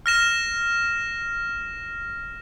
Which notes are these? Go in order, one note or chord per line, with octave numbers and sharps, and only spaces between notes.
F6 A#6 E7